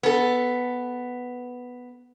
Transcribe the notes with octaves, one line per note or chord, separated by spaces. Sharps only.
B3 A4